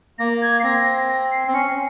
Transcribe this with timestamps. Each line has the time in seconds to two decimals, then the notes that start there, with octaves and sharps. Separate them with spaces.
0.19 A#3 A#6
0.42 G#6
0.59 C7
0.63 C4 A#6
1.09 A#6
1.31 C7
1.47 C4
1.53 C#4 C#7